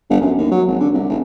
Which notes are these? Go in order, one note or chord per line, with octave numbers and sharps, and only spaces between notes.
G1
F#2
D#2
F#3
G#1
D3
C2
G#1